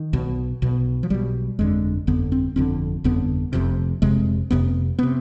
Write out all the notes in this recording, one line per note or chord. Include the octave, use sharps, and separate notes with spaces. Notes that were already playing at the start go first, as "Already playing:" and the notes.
Already playing: D#3
B1 B2
B1 B2
F3
B1 B2 G3
G1 F2 D3 G#3
G1 F2 D3 B3
C4
G1 F2 D3 C4
G1 F2 D3 B3
F1 F2 C3
F1 F2 C3 G#3
F1 F2 C3 B3
C3 B3